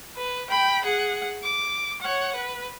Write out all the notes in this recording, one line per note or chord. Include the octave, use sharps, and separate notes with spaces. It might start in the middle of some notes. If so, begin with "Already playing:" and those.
B4
G5 B5
G#4 F#5
D6
C#5 F#5
B4